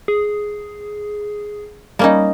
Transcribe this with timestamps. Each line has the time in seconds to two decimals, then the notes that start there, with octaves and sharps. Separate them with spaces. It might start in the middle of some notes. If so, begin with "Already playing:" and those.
0.08 G#4
1.99 G3 A#3 C#4 D#4